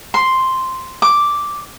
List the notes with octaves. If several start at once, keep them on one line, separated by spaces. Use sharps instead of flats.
C6
D6